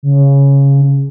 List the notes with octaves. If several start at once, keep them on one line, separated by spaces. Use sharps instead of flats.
C#3